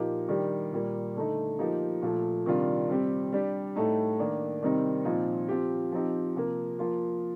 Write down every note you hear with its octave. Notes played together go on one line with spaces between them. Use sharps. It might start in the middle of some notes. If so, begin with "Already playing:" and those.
Already playing: A#2 F3 A#3 D#4 G4
D#3 G3 D4 G4
A#2 G3 A#3
D3 A3 D#4
F3 A#3 D#4 G4
A#2 F3 A3
C3 D#3 G3 D4 F4
C3 G3 C4 G4
G3 D4 G4
A2 A3 D#4
D#3 A#3 D4
C3 D#3 G3 C4 D#4
A#2 F3 C4 D#4
F3 C4 G4
F3 C4 D#4 G4
C3 F3 A#3
F3 A#3 F4